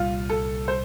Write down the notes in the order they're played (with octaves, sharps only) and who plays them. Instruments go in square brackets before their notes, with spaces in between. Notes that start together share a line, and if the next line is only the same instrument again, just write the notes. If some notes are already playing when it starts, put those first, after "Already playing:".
Already playing: [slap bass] C2 A#2 G3 [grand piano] F4
[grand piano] A4
C5